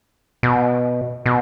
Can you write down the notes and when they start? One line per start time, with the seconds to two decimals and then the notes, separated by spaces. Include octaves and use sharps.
0.43 B2
1.26 B2